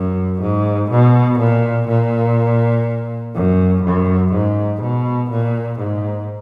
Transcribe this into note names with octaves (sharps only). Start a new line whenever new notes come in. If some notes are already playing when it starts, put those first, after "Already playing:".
Already playing: F#2
G#2
B2
A#2
A#2
F#2
F#2
G#2
B2
A#2
G#2